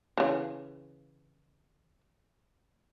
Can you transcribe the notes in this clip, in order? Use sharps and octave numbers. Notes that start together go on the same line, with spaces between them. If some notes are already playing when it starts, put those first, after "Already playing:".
C#3 E3